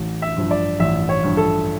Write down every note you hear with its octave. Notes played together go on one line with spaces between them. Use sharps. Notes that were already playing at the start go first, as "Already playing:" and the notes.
Already playing: A1
E5
G2 F3
D5
A1 E5
C#5
G2 F3
A4